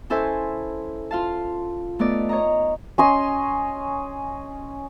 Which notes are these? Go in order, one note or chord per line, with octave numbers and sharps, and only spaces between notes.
C#4 E4 A4 C5 E5 G#5
F4 F5 A5
A3 B3 D#4 D5
C#5 D#5 A#5
C#4 D#5 C6